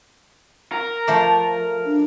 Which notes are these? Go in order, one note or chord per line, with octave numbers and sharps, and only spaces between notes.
A#4
F3 A3 D5
D4